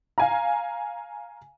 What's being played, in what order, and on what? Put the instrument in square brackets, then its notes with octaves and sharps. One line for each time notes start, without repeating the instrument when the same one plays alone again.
[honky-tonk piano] F5 G#5 A#5